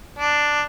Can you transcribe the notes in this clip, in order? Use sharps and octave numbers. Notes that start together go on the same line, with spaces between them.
D4